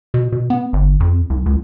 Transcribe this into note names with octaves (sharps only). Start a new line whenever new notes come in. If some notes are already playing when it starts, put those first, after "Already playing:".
B2
B2
B3
G1
F2
C2
C#2